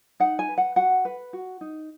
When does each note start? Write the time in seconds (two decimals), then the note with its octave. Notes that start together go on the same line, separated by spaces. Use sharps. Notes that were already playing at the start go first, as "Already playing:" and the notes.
0.20 D#4 F#5
0.39 G#5
0.49 B4
0.58 F#5
0.76 F#4 F#5
1.05 B4
1.33 F#4
1.61 D#4